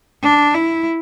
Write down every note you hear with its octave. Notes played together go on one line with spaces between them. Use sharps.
D4
E4